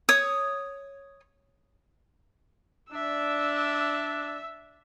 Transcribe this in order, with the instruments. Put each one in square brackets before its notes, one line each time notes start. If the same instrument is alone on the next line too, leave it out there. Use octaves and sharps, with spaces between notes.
[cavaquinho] C#5 D#6
[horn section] D4 [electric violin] E5 E6